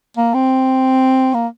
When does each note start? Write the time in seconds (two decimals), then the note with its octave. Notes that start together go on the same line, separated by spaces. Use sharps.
0.17 A#3
0.34 C4
1.34 A#3